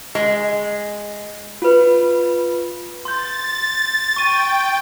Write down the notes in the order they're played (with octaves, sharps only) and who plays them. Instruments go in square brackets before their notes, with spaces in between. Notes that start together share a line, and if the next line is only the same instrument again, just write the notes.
[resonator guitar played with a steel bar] G#3
[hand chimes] F4 B4
[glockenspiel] C6 G6 [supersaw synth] A6
[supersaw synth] G5 [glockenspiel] C#6 D#7